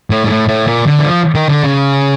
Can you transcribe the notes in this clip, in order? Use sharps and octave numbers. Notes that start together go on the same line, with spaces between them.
A2
G#2
A2
A2
A#2
D3
E3
F3
D#3
D3
C#3